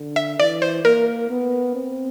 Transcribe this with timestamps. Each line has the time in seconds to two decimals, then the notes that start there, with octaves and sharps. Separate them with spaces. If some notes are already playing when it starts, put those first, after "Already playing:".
Already playing: D3
0.16 E5
0.40 E3 D5
0.62 C5
0.84 A#3 A#4
1.30 B3
1.75 C4